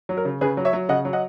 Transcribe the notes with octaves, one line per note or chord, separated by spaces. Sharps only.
F#3
A#4
C#3
C#3 G#4 B4
F#3
C#5 E5
F#3
C#3 D#5 F#5
F#3
D#5 F#5